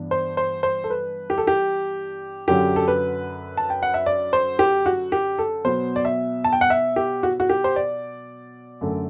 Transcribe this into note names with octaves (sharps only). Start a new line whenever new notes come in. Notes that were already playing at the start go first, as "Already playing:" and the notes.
Already playing: G2 E3 B3 D4
C5
C5
C5
A4
B4
G4
A4
G4
F#2 D3 F#3 G4
A4
B4
A5
G5
F#5
E5
D5
C5
G4
F#4
G4
A4
B2 F#3 B3 C5
D5
E5
A5
G5
F#5
E5
G4
F#4
F#4
G4
C5
D5
F#2 D3 A3